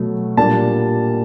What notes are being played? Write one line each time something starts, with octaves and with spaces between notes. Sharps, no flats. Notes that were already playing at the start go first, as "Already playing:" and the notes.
Already playing: B2 F#3 A3
A#2 G3 A#3 D4 A5